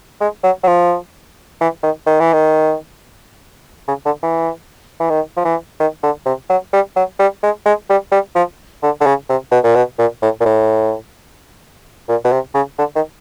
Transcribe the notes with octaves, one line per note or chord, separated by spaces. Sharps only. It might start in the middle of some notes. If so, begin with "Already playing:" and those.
G#3
F#3
F#3
F3
E3
D#3
D#3
E3
D#3
C#3
D3
E3
E3
D#3
F3
E3
D#3
D3
C3
F#3
G3
F#3
G3
G#3
G#3
G3
G3
F3
D3
D3
C#3
C3
B2
A#2
B2
A#2
A2
A#2
A2
A#2
B2
C3
C#3
D3
D#3